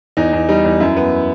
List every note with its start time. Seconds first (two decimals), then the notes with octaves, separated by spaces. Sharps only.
0.17 E2 D#4
0.33 E2
0.49 G3 D#4
0.65 E2
0.80 F#2 E4
0.97 B3